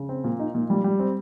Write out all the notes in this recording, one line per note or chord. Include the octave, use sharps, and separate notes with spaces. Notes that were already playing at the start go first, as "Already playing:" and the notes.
Already playing: C#3
C4
A#2
D#4
A#2
G3
G3
C4